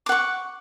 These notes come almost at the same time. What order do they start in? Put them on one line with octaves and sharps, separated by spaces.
D6 F#5 C#6